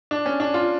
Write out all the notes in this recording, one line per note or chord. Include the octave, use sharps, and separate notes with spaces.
D4
C#4
D4
F4